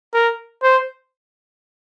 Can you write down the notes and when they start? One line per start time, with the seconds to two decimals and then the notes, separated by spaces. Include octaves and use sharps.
0.14 A#4
0.63 C5